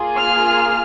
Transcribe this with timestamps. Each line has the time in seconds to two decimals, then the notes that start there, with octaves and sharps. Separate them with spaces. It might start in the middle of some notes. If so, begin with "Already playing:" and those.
Already playing: A#3 F4 G#4
0.18 F6